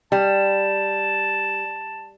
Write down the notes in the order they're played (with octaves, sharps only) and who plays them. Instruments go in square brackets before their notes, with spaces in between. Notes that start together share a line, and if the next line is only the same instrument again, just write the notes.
[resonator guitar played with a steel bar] G3 [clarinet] A5